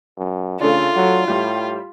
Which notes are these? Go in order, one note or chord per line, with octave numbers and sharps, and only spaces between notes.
F#2
C#3 A3 D4 F4
F#3
A2 G3 G4